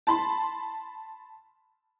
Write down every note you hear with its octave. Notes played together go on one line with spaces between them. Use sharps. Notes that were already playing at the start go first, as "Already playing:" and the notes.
A5 B5 C6